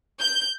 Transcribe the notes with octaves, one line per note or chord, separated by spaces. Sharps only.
G6